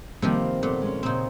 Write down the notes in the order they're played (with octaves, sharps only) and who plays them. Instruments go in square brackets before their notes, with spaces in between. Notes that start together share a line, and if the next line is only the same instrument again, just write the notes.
[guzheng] C3 D#3 F3 [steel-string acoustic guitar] G3 A#3 C4
[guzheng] A#2 [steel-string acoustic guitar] A3 B3
[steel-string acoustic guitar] G#3 C#4
[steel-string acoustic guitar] A#2 C#3 [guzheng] C4 D#4